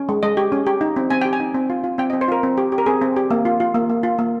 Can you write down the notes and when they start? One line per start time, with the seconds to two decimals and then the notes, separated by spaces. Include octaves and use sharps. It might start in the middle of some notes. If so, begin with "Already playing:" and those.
Already playing: C#4
0.09 G#3
0.23 G#3 D#5
0.37 G4
0.52 C#4
0.67 G4
0.81 D#4
0.96 C4
1.10 C4 G#5
1.22 G4 G5
1.33 G#5
1.40 D#4
1.54 C4
1.70 F4
1.84 F4
1.98 C4 G5
2.10 D#5
2.13 C4
2.21 C5
2.28 F4 A#4
2.43 C4
2.58 G4
2.72 G4
2.78 A#4
2.86 C4 G#4
3.02 C4
3.17 G4
3.31 A#3
3.45 F4
3.60 F4
3.74 A#3
3.90 A#3
4.03 F4
4.19 A#3